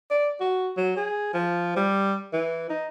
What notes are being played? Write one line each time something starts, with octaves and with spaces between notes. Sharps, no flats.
D5
F#4
F#3
G#4
F3
G3
E3
D#4